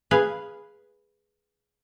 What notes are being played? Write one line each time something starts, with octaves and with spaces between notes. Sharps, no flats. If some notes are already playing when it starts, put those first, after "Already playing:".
G#4 B4 F5